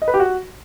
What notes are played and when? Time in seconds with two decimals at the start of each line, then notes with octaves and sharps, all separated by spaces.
0.02 D#5
0.08 B4
0.14 G4
0.20 F#4